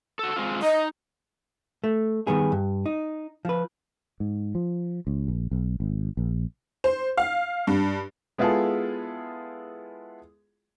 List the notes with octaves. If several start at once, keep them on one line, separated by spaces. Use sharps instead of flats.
F#4 A4
G#3 C4 F4
D#4 D#5
A3
D#3 G3 B3 G#4
G2
D#4
F3 B4
G#2
F3
C#2
A#1
B1
G#1
A#1
C5
F5
G2
G#3 B3 E4 F4 G#4 A4